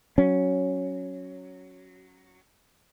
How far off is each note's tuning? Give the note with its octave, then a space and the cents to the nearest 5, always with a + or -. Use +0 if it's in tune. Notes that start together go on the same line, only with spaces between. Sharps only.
F#3 +0 C#4 +0